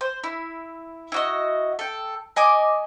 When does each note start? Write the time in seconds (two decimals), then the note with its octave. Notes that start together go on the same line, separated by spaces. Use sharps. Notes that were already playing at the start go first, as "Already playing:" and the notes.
0.01 C5
0.24 E4
1.12 E4 F#4 D#5
1.79 A4 G5
2.36 D#5 G#5 D6 D#6